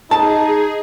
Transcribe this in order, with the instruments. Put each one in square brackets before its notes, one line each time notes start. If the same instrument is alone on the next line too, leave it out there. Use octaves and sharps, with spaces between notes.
[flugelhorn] D#4 [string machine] G#4 [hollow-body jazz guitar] A5